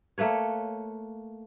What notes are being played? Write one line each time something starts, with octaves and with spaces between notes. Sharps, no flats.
A3 A#3 B4 C#5